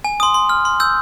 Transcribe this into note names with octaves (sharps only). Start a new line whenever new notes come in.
G#5
C6 D#6
C6
F6
C6
E6 G6